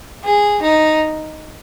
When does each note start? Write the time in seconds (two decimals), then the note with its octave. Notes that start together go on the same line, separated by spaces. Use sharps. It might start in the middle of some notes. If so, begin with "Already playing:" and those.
0.25 G#4
0.63 D#4